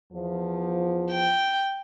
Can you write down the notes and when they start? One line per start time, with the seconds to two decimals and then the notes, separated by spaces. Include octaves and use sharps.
0.13 E2 F3
1.11 G5